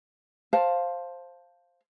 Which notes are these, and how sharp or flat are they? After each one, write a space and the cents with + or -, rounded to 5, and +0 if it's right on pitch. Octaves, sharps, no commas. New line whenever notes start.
C5 +10 F5 +0 A5 +0